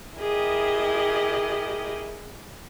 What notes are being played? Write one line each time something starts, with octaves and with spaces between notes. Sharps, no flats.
E4 G4 G#4 A#4 D#5